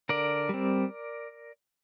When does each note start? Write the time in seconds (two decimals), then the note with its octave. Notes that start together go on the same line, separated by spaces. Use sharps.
0.09 D3 A#4 D5
0.49 G3 C4